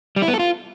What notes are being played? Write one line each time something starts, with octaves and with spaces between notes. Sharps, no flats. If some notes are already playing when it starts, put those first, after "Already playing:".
G3
E4
B3
A4
F4